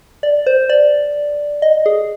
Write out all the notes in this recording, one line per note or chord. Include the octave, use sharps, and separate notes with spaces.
D5
C5
D5
D#5
G#4